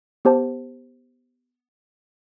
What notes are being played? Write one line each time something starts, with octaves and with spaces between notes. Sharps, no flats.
B3 G4 C5 A5